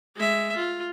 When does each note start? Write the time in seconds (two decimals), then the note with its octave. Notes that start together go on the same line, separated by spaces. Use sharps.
0.16 G#3 E5
0.56 F4